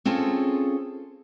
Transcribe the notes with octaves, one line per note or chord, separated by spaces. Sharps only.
C4 C#4 F4 G#4 A4